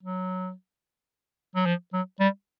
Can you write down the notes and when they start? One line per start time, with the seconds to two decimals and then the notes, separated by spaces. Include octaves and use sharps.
0.03 F#3
1.55 F#3
1.66 F3
1.93 F#3
2.20 G3